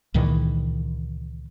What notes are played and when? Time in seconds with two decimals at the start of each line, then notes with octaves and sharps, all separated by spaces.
0.14 C#2 A#2 D#3 E3